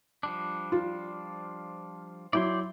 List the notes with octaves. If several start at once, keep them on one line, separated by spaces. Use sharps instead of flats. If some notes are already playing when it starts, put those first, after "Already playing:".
F3 G3 D4
F4
F#3 E4 D5 G5 C6